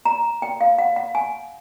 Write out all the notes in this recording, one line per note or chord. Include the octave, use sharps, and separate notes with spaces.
A#5
G5
F5
F#5
F#5
G#5